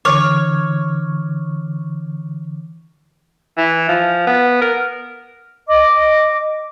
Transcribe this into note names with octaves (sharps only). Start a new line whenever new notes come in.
D3 E3 C#5 D6 F6
E3
F3
B3
A#4
D#5 D6